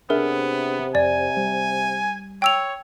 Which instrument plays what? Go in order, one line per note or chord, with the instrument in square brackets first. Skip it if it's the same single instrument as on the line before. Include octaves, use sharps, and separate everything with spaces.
[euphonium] C3 [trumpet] B3 [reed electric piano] D4 G#4 E5 [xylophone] A#4
[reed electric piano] F2 [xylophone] D5 [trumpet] G#5
[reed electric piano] G3
[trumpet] C#5 [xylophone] G5 E6 F7